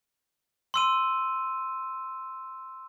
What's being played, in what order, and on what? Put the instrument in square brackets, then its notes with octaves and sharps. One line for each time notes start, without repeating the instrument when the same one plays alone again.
[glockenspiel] C6 E6 D#7